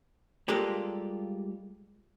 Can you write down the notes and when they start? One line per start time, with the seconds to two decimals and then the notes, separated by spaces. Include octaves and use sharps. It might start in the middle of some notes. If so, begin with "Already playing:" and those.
0.48 G3 G#3 A#3 F4 G4 A4